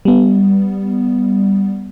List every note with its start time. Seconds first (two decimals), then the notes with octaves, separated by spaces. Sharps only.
0.05 G3 B3